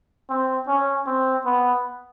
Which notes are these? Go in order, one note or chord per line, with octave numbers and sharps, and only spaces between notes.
C4
C#4
C4
B3